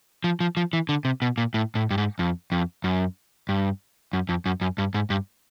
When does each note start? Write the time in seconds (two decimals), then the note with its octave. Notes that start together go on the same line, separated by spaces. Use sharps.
0.24 F3
0.40 F3
0.57 F3
0.73 E3
0.89 D3
1.05 C3
1.22 B2
1.38 A#2
1.54 A2
1.75 A2
1.91 G2
1.98 G#2
2.19 F2
2.52 F2
2.84 F#2
3.49 G2
4.13 F#2
4.29 F2
4.46 F#2
4.61 F#2
4.78 G2
4.94 G#2
5.10 G2